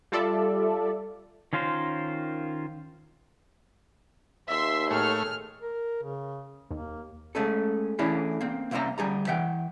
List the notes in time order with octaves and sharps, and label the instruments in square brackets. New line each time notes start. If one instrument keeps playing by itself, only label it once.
[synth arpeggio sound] G3 F4 A4 D5 E5
[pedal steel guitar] D#3 C#4 F4 A#4 C5
[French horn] D#2 [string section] E5 C6 E6
[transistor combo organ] A2 A3 C#5 [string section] G#4 F6
[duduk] A#4
C#3
[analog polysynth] D#2 [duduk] A#3
[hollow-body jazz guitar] G#3 A3 C#4 A4
E3 A3 C#4 D4 E4 G#4
A#3 C4
C2 A#3 C4 C#4 E5 A#5
D2 G3 G#4 A#5
E3 E5 F#5 G5